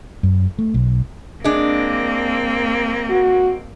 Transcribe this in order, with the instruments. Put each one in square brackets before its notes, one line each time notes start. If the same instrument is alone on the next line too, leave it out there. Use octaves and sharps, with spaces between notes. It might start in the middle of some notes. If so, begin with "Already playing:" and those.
[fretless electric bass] F#2
A3
B1
[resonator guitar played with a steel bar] G#3 D4 [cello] A#3 C4
[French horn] F#4